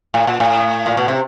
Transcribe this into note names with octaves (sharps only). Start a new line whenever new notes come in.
A2
A#2
A2
A#2
B2
C3